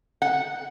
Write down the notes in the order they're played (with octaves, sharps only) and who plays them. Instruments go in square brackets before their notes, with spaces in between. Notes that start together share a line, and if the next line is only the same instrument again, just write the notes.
[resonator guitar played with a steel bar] F#5